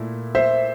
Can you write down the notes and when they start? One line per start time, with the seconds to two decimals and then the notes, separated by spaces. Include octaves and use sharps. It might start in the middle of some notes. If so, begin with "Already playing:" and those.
Already playing: A#2 A3 E4
0.35 C5 E5